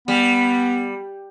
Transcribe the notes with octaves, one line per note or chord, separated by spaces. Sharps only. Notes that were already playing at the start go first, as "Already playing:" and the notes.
G3 B3